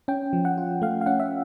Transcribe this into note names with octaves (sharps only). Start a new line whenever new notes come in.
C#4 G5
F3
F#5
F4
A3 F5
F5
C#4 F#5
E5